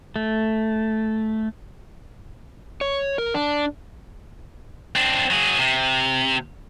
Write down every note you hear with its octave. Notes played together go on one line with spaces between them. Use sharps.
A3
C#5
A#4
D4
C4 D4
F#3 G#4
C3